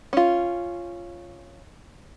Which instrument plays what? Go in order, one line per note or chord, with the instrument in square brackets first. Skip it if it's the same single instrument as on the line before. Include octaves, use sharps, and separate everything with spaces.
[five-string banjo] C#4 F4